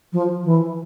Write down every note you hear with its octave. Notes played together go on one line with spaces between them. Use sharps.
F3
E3